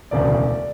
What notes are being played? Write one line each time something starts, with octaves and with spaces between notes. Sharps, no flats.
E1 D2 C#3 D5